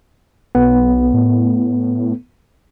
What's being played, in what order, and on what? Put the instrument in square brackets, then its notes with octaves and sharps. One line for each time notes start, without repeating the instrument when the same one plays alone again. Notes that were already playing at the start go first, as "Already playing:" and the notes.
[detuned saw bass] B1 [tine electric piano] B3
[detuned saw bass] A2